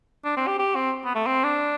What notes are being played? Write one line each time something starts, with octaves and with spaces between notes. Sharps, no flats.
D4
C4
G4
G4
C4
B3
A3
C4
D4